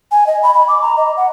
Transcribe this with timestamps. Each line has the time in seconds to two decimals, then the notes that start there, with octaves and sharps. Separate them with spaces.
0.11 G#5
0.27 D#5
0.43 B5
0.54 B5
0.68 D6
0.82 A#5
0.97 D#5
1.17 F#5